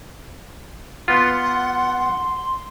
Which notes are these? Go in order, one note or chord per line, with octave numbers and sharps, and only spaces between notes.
B3 F4 F#5 C6